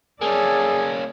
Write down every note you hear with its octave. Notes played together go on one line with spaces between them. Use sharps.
A#3 C#4 G#4 A4 D5